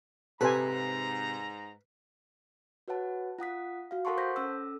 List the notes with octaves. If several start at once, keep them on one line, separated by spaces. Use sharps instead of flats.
G#2 C3 A4 B4 C5 G#5 A#5
F#4 B4 C#5 F#5 A5
F4 F#5 D#6 B6
F#4 F5
A4 A#4 F#5 A5 C6 C#6
C5 G6 A#6 B6
C#4 A4 E6